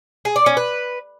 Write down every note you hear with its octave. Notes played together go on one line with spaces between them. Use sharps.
G#4
D5
C#4
B4